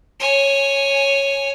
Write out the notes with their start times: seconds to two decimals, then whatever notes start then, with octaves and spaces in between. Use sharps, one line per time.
0.20 C#5 G#5